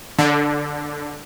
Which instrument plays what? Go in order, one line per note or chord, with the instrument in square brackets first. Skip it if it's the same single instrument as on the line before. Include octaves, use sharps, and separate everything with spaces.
[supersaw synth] D3